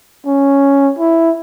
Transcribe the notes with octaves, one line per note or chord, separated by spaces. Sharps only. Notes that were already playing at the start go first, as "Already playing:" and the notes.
C#4
E4